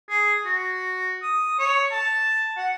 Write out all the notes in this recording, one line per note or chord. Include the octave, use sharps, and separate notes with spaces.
G#4
F#4
D#6
C#5
A5
F#5